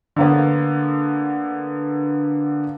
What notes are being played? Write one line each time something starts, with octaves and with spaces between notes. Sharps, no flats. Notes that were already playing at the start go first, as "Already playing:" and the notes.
D3 A#3 B3